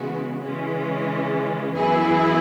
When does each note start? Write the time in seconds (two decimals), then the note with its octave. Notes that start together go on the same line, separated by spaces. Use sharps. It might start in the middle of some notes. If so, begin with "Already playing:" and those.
Already playing: C#3 E3 G#3 B3 F#4
0.43 C#3 E3 G#3 C#4
1.75 F#2 E3 B3 E4 G#4